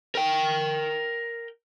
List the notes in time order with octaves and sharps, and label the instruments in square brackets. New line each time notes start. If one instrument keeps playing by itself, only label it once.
[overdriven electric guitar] A#4 G5